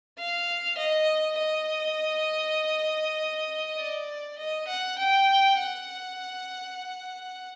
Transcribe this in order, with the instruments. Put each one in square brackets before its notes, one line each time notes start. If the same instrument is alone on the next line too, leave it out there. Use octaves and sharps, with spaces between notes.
[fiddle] F5
D#5
D#5
D5
D#5
F#5
G5
F#5